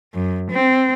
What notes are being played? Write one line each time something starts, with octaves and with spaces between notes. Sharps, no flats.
F#2
C4